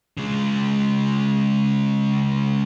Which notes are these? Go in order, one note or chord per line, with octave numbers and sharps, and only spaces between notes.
C#3 G#3